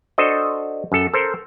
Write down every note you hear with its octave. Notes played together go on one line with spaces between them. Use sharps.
D4 F#4 A4 C5 D#5
F#2 A4
A4 A#4 C5